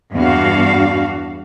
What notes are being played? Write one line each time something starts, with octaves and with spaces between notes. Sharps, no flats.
E2 G2 D4 F#4 F5